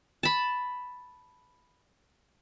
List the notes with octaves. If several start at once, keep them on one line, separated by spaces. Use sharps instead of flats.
A5 B5